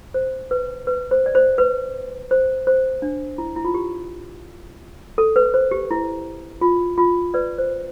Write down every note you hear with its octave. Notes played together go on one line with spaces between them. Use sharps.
C5
B4
B4
C5
D5
C5
B4
C5
C5
D4
E4
E4
F4
G4
A4
B4
C5
G4
E4
F4
F4
B4 D5
C5